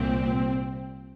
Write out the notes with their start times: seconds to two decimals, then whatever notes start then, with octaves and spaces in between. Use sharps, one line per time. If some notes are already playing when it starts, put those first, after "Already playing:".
Already playing: C2 A#2 C4